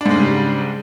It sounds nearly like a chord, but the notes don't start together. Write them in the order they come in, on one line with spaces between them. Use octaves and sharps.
D4 G#2 G#3 C#3 G3